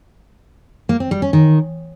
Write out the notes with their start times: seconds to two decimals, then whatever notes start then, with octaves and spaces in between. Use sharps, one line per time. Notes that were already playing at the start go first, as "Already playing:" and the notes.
0.89 A#3
1.00 C4
1.11 G3
1.22 C#4
1.33 D#3